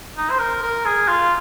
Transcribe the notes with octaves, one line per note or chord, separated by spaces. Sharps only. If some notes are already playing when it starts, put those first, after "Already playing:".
D#4
C5
A#4
A#4
G#4
F4